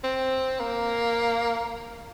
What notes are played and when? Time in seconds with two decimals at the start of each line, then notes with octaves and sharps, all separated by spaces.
0.04 C4
0.60 A#3